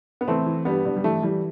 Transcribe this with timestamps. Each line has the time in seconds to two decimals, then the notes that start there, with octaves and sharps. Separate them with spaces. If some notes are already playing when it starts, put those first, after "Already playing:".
0.21 B3
0.28 E3 A3 C4
0.46 E3
0.65 G2 G3 B3
0.85 G2
0.96 G3
1.04 E3 A3
1.23 E3 G3